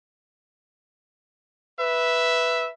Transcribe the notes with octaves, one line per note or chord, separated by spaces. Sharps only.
B4 E5